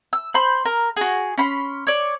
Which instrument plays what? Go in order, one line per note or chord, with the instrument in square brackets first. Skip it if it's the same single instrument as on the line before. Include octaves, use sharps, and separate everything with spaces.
[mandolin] E6
C5 B5 C6
A#4
F#4 G#4
C#4 B5 C6
C#5 D5